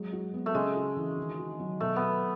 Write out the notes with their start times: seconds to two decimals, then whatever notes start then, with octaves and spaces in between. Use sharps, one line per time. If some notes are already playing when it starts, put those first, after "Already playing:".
Already playing: F#3 G#3
0.13 F#4
0.34 B3
0.46 A3
0.54 C#3 G#3
0.75 F#4
0.96 E3
1.17 D#3
1.39 F#4
1.60 F#3
1.80 B2 A3
1.96 B2 B3